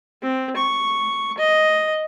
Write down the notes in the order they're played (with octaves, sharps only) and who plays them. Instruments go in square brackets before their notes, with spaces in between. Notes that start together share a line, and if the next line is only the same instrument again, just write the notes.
[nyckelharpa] C4
C#6
D#5